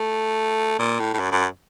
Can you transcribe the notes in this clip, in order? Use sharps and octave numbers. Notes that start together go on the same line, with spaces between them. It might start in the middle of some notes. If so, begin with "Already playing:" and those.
Already playing: A3
A#2
A2
A2
F#2
F#2